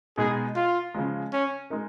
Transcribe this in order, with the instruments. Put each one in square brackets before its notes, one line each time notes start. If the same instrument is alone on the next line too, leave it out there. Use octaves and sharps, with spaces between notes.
[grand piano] B2 G#3 B3 D#4 [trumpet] G#4
[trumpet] F4
[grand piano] C#3 F3 G#3
[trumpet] C#4
[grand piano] G#3 D#4 A#4